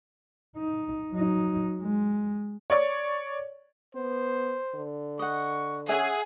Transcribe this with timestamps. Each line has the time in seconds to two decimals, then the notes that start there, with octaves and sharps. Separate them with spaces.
0.57 D#4
1.13 F#3 D#4
1.82 G#3
2.70 C#5 D5 C#6
3.95 B3 C5
4.75 D3
5.19 D#5 F#5 C#6
5.89 C#4 G#4 E5 F#5 G#5